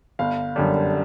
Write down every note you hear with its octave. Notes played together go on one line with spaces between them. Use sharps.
G1 F5
F#2 D3 G3